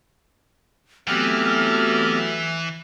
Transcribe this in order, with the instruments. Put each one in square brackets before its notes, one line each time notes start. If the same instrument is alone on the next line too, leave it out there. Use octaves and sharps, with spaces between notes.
[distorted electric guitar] E3 [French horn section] F#3 A3 [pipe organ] B3 C4 G4 [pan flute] F6